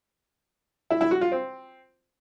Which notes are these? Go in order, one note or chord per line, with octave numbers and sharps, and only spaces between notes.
E4
E4
F#4
F4
C4